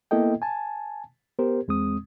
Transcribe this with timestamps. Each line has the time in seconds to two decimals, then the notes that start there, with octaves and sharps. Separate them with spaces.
0.11 A#3 B3 E4 A4 D#5 G5
0.42 G#5 A5
1.38 B3 G4 A#4 C5
1.68 E2 G#3 C4 D#6